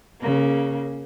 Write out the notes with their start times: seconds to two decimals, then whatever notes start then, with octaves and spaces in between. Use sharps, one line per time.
0.21 C#3 A#3